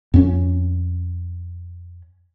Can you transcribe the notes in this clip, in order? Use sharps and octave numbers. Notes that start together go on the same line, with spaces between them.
F2 C#4